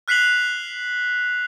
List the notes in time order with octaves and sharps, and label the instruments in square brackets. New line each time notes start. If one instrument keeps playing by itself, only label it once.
[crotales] F6 F#6 B6 C7 F7 F#7